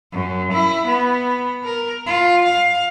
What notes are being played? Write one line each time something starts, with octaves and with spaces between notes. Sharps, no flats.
F#2
E4
B3
A#4
F4
F5